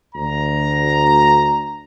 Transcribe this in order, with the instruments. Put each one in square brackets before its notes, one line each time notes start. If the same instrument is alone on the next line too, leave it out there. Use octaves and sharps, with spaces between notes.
[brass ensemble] D2 A#5